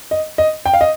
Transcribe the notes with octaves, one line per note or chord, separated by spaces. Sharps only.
D#5
D#5
G5
F5
D#5